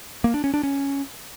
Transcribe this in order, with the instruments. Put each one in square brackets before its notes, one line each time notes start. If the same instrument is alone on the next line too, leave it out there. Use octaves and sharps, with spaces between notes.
[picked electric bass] A#3
D4
C#4
D4
C#4